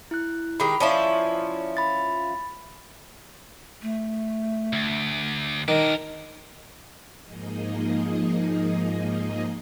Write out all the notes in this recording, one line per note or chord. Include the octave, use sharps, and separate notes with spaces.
E4 F#6
D#3 G#3 G4 B5
F3 C#4 E4 D5 A5 C#6
B5 A6
A3
D2
D#3 D4 A#4
G#2 F3 A#3 D#4 G#4 D#5